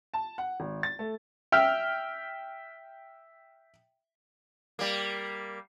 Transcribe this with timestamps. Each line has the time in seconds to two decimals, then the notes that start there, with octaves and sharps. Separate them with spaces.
0.14 A5
0.38 F#5
0.60 G#1
0.83 A6
0.99 A3
1.52 E5 G5 F6
4.79 G3 A#3